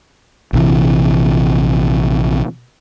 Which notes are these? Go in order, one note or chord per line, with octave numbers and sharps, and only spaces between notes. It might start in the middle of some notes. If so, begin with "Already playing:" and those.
A#1 C3 E3